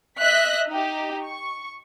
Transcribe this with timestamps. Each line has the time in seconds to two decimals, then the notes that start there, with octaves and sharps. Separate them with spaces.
0.20 D#5 E5 F#6 B6
0.69 D#4 G4
1.22 C#6